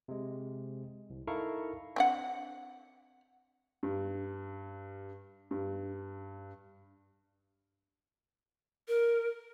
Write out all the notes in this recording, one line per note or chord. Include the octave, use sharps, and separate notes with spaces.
C3 G#3
C2
D#4 E4 A4 A#4 F5 C#6
C4 D4 F#5
G2
G2
A#4